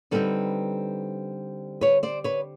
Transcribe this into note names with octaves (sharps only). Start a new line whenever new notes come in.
D3 G3 C4 D#4 A4 B4
B4 C#5
C5 D5
B4 C#5